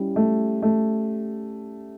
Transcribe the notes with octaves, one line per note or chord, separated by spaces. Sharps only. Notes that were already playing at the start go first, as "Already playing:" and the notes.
Already playing: G3 C#4 E4 G4
A3
A3